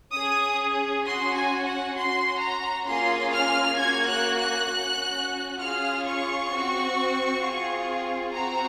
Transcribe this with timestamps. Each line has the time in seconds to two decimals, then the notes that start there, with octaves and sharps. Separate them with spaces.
0.13 C#4 G#4 D#6
1.05 C#4 F#4 C6
1.35 G#5
1.66 F#5
1.96 C#4 F#4 C6
2.41 A#5
2.86 A#3 C#4 F4 G#4 C6
3.33 F6
3.78 A#3 C#4 F#4 G#6
4.09 F#6
4.39 F#6
4.69 C#4 F#4
5.60 C#4 F4 G#4 F6
6.06 C#6
6.52 C4 F#4
7.42 C4 F4 G#4
8.33 C4 F#4 A#5